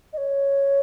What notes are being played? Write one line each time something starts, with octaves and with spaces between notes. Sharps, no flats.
D#5
C#5